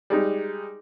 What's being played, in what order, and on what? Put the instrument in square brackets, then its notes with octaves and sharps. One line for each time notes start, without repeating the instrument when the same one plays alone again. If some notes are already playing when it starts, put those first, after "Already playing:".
[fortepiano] G3 G#3 D#4